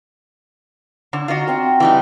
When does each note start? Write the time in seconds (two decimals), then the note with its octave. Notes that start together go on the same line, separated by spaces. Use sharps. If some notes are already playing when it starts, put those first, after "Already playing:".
1.13 D3 C#6
1.28 D#4 F4 F#4 D#5
1.48 C4 G5
1.80 E3 G3 D#4